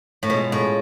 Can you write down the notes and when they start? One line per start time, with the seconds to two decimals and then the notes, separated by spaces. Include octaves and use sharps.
0.23 A2
0.30 B2 G#3 C#4 F4 G#4
0.52 A2